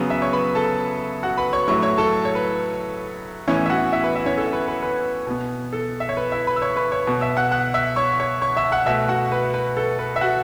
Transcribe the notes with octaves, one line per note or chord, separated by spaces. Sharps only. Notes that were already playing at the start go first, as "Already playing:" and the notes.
Already playing: C#3 F#3 B3
E5 E6
C#5 C#6
B4 B5
A4 A5
F#4 F#5
B4 B5
C#5 C#6
A2 F#3 A3 C#5 C#6
C#5 C#6
A4 A5
C#5
B4
A2 E3 B3 C#4 C#5
E5
F#4 F#5
E4 E5
B4
E4 E5
C#4 C#5
A4
B4
B4
B4
B2 B3
A4
E5
C#5
B4
E4 E5
B4 B5
E6
C#5 C#6
B4 B5
C#5 C#6
B2 B3
E5 E6
F#5 F#6
F#5 F#6
E5 E6
C#5 C#6
C#5 C#6
C#5 C#6
E5 E6
F#5 F#6
B2 A3 E5 E6
F#4 F#5
B4
B4
A4
B4
E5
F#4 F#5